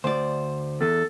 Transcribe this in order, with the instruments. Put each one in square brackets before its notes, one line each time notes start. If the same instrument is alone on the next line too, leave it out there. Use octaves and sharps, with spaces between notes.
[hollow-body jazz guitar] D2 D5 [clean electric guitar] C5
[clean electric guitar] E2 [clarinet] A4